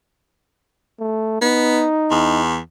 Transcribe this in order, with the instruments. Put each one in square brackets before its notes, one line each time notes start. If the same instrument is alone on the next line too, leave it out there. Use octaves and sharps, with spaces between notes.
[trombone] A3
[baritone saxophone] B3 [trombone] D#4
[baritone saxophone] E2